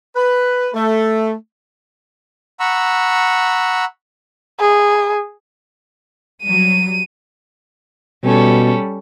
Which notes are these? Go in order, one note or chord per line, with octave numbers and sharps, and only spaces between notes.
B4
A3
F#5 A#5 B5 C#6 E6
G#4
F#3 G3 D#7
B2 G3 C#4 A4